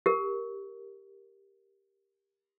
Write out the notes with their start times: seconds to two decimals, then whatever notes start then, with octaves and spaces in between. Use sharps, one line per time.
0.06 G4 A#4